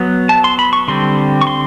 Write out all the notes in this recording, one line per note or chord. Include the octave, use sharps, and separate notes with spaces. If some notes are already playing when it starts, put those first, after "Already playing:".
Already playing: F#3 B3
A5
C6
B5
C#6
D3 G3 C4 C6
C#6
C6